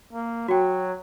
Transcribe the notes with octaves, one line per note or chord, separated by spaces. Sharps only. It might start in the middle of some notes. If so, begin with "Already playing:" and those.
A#3
F#3 F#4 G5